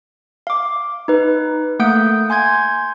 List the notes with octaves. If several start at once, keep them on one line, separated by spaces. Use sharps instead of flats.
F5 D6
D#4 B4
A3 A#3 F#5 D#6 G6 D7
G#5 C6 G6 G#6